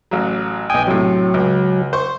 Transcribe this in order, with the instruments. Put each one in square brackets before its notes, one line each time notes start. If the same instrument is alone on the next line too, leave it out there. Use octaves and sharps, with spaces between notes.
[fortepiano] A1 F#3
[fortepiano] B1 D#6 [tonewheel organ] G5 G#5
[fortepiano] A2 C3 [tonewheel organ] F#3
[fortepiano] C#2
C5 C#6